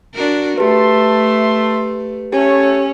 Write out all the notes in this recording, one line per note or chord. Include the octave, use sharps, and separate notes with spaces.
D4 F#4 A#4
A3 G4 B4 E5 A5 C6
A3 C#4 G4